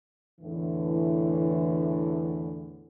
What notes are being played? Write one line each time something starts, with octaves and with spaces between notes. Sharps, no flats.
E2 A2 D3 E3